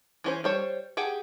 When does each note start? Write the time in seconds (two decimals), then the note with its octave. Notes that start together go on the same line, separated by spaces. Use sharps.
0.24 E3 C#4 C5
0.44 G3 C5 C#5
0.97 G4 G#4 F#5